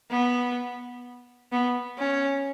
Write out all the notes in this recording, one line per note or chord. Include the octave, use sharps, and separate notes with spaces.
B3
B3
C#4